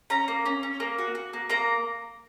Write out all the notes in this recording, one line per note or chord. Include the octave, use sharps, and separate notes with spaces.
C#4 A#5
A#3
C#4
C#4
A#3
F#4
F#4
A#3
A#3 A#5